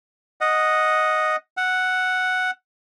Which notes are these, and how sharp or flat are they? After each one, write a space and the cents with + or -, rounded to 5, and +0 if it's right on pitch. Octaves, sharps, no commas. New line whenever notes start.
D#5 +0 F#5 -10
F#5 +0 E6 +25